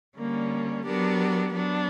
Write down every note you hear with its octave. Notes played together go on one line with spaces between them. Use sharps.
D3 G3 A#3 C#4
F#3 B3 D4 G4 A#4
F#3 B3 D4